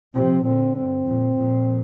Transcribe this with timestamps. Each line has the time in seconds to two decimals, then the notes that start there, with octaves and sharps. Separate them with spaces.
0.15 C3 F3 C4
0.45 A#2 D3 C4
0.75 G2 C4
1.06 F2 A#2
1.36 F2 A#2